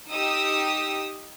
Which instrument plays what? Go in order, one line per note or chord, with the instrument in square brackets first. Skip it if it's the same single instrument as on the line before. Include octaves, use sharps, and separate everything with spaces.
[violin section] D#4 G4 D#6 E6